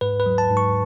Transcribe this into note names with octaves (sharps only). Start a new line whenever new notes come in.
G#2 B4
B4
F#3
A5
G#2
C#6